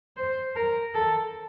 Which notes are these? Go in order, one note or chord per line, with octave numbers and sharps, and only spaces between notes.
C5
A#4
A4